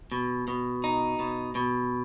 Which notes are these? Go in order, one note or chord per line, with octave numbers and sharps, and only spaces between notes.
B2
B2
D#4
B2
B2